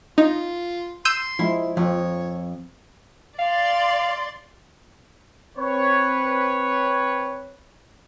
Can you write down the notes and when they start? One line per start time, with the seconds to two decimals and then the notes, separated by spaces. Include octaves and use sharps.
0.18 D#4 F4
1.05 C6 E6 G6 D#7
1.39 F3 G#3 E4
1.77 F2 F3 C#5
3.39 D5 F5 C6
5.57 C4 B4 C#5